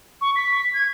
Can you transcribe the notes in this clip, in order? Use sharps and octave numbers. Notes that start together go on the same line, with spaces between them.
C#6
B6
G#6